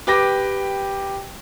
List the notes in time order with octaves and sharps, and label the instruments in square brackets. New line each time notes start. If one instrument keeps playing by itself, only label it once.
[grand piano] G4 B4 G5 D6 A#6